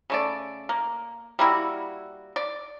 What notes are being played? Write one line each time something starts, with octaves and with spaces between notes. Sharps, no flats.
C#3 A3 D5
A#3
G3 A#3 E4 F#4
D5